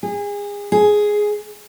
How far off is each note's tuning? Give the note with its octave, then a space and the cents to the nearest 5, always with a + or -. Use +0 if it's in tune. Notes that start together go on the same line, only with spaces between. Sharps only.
G#4 -30
G#4 +5